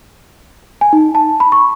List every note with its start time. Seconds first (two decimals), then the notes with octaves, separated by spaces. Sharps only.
0.81 G#5
0.93 D#4
1.15 A5
1.40 B5
1.52 C#6